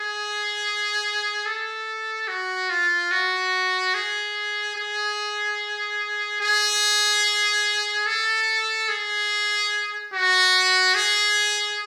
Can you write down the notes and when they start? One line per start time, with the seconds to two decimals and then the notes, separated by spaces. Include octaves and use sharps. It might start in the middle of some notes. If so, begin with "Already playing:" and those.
Already playing: G#4
1.46 A4
2.28 F#4
2.70 F4
3.11 F#4
3.94 G#4
4.76 G#4
6.40 G#4
8.06 A4
8.89 G#4
10.13 F#4
10.95 G#4